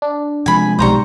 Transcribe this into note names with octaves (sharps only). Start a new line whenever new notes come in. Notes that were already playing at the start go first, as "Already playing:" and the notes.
D4
C3 F3 G#3 G#5 B5
B1 G#2 G3 C5 A#5 C#6